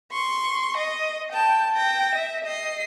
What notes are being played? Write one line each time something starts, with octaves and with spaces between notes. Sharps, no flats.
C6 C#6
D#5
G5 A5
G5 A#6
E5
D#5 C7